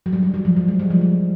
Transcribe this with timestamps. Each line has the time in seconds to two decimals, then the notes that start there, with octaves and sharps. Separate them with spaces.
0.06 F#3
0.13 G3
0.23 G3
0.34 F#3
0.45 F3
0.57 F#3
0.68 G#3
0.79 G3
0.90 F3
1.01 F3